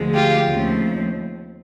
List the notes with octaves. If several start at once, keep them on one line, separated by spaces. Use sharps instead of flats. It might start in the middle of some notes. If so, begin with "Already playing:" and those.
Already playing: D2 D3 F3 G#3
F4 G4
D#2 C#3 F3 A3 C4